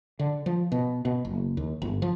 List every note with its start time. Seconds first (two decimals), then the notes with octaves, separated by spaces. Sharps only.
0.19 D3
0.46 F3
0.72 B2
1.05 B2
1.25 F#1
1.57 D#2
1.82 G1
2.02 F3